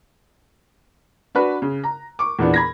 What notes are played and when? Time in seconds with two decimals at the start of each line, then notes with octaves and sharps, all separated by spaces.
1.35 D4 F#4 B4
1.62 C#3
1.84 A#5
2.19 C#6 D6
2.39 E2 A#2 E3 B3 D4
2.54 B5 G#6 A#6